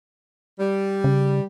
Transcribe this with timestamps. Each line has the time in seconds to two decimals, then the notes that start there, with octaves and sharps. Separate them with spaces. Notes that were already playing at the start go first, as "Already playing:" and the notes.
0.60 G3
1.04 C#3